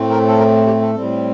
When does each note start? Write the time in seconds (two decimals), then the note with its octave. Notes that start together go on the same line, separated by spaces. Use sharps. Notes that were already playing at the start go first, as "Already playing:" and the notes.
Already playing: A2 A3 C4
0.10 A#4
0.28 A4
0.38 A#4
0.67 G4
0.81 A4
0.95 A2 G3 C4